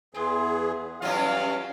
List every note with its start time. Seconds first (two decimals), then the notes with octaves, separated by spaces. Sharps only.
0.15 E2 E3 C4 F4 G#4 B4
1.02 G2 E3 F#3 C#4 F4 G#4 F5